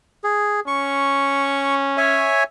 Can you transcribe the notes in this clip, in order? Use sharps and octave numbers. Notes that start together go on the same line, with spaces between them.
G#4
C#4 C#6
C#5 E5 G#5